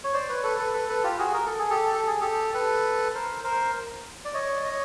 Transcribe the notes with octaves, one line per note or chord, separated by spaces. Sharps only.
C#5
C5 D5
B4 C#5
A4 B4
A4 B4
A4 B4
A4 B4
F4 G4
F#4 G#4
A#4
A4
G#4
G4 A4
A4
G#4
G4 A4
A4 B4
A#4 C5
A#4 C5
D5
C#5 D#5
D5
C#5 D#5